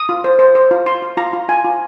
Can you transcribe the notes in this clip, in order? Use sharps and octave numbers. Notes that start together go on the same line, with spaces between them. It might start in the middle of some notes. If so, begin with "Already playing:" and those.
Already playing: D#6
F4
C5
C5
C5
F4
F4 C6
F4
F4 A#5
F4
F4 G#5
F4